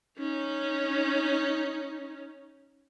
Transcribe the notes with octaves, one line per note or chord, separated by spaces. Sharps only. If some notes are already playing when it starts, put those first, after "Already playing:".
C#4 D#4